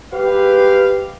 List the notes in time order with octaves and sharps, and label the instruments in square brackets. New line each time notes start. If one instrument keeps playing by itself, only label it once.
[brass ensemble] G#3 B4 F5 [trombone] G4